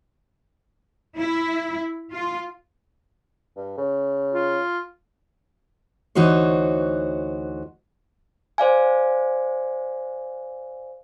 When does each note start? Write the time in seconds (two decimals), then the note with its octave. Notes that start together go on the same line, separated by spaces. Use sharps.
1.18 E4
2.14 F4
3.57 G2
3.78 C#3
4.34 F4
6.15 D2 E3 D#4 F#4 C5 C#5
8.58 C5 D5 F5 G#5